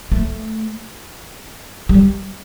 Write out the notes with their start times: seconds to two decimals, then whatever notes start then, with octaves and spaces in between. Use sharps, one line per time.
0.12 A3
1.89 G3